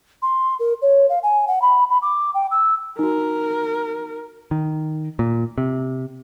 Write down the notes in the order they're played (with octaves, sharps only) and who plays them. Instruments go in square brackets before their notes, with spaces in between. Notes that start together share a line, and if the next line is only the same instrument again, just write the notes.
[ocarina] C6
A#4
C#5
F5
G#5
F#5
B5
B5
D6
G5
E6
[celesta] D#4 F#4 [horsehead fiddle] A#4
[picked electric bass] D#3
A#2
C3